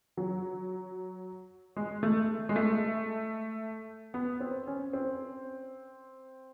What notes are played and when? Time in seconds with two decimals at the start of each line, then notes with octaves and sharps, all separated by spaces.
0.17 F#3
1.76 G#3
2.03 A3
2.49 G#3
2.56 A3
4.14 B3
4.40 C4
4.67 C#4
4.93 C4